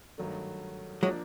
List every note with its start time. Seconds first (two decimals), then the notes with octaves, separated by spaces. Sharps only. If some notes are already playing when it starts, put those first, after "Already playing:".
0.18 G2 D#3 F#3 A3
1.03 F3 F#3 G#3 A#3 D4